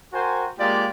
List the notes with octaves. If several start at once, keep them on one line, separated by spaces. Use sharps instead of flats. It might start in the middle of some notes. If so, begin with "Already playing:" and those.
F#4 A#4 C5 G5 G#5
G#3 A#3 F4 G4 D5